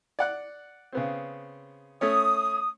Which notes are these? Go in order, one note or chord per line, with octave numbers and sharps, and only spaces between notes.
D5 F#5 F#6
C#3 B3 C4
A3 C#4 C#5 D#6